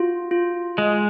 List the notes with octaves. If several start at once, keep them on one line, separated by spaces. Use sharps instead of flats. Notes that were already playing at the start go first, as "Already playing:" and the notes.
Already playing: F4 F#4
F4
G#3 D#5